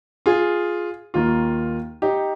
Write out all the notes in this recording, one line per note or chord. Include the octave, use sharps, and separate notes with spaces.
F4 G#4
D#2 D#3 A#3 F4
D#4 G4